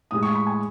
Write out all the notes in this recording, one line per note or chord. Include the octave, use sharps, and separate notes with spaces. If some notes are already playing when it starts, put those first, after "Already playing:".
A2 G#3 D#6
C#6
B5
G#5